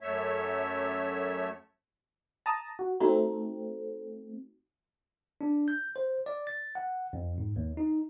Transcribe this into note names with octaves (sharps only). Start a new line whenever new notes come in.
F#2 A3 C#5 E5
A5 A#5 D#6
F#4
A3 C4 D#4 F#4 A#5
D4
G6
C5
D5
A6
F#5
F2
G#2
D#2
D#4